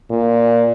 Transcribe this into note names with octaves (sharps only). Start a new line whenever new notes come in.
A#2